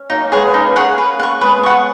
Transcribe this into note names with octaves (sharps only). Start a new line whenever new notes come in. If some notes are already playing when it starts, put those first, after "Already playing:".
Already playing: C#4
F#3 A#3 D#4
G#3 B3 G#4 C#5 F#5
B3
A#3 C#4 D#4
G#4 C#5 F#5
B4
F#5 C#6
G#3 B3 B4
F#5 C#6